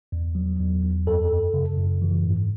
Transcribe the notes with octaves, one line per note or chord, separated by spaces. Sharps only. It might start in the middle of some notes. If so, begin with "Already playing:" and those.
E2
F#3
E2
E2
F#2 A4
F#2
C#3
F#2
E3
G#2